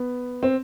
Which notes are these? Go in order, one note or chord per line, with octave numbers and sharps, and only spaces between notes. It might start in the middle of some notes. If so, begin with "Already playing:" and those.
Already playing: B3
C4